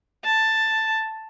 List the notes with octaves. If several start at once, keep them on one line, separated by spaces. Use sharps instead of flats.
A5